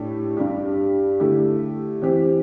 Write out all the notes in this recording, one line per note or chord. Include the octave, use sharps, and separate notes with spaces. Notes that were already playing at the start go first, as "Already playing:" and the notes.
Already playing: A2 A3 D4 G4
G2 G3 D4 G4
D3 A3 E4 G4
E3 C4 G4